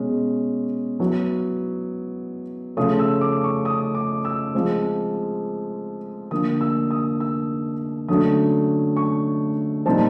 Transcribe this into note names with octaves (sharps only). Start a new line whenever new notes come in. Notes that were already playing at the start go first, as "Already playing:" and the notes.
Already playing: B2 G#3 C#4
F#3 B3 E4
C#3 F3 A3 C#4 F4 D#6
E6
D6
C#6
D#6
D6
E6
F3 G#3 C4
D3 F3 A#3 D#6
E6
D#6
E6
D3 F#3 A3 C#4 D#6
C#6
A#2 G3 C4 D#4 A5